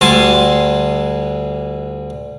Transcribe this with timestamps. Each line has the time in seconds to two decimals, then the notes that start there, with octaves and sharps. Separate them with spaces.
0.01 D2 D3 G3 G#5 A5 C6